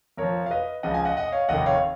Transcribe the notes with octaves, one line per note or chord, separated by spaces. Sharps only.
F2 F3 A#4 C#5
F5
B4 D#5
C#2 C#3 F3 D#5 F#5
F5 G#5
D#5 F#5
D#5 F#5
C#5 F5
F1 D#2 D#3 D#5 F#5
C#5 F5